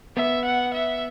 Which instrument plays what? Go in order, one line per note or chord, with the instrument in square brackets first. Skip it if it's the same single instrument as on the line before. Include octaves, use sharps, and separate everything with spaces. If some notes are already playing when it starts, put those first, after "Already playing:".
[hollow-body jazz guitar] B3 [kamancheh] E5
[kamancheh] F#5
E5